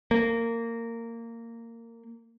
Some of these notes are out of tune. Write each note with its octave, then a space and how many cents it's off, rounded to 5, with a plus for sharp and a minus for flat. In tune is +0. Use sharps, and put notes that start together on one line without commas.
A#3 -20